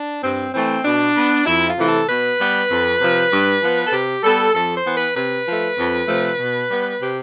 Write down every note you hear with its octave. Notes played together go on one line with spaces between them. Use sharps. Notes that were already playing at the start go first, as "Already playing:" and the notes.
Already playing: D4
G2 C4
E3 A3 C4
B2 D4
B3
F2 E4
F4
C3 E3 A3
A4
B2 B4
G3 B3
F2
C3 F3
G2
F3 B3
A4
C3 G4
G3 B3 A4
F2 A4
C5
E3 B3
B4
C3 B4
F3 A3
F2
C3 F3 A3
B2
G3 B3
C3 G4